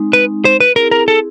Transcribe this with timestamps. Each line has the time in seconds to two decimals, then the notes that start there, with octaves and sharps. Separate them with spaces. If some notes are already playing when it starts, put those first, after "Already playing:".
Already playing: G#3 C4 D#4
0.13 B4
0.45 C5
0.60 B4
0.76 C4 E4 G#4 A#4
0.91 A#4
1.08 A4